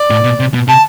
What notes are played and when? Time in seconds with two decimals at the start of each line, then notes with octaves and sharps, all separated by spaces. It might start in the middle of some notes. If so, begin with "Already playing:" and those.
Already playing: D5
0.10 A2
0.24 B2
0.40 C3
0.54 B2
0.68 C3 A5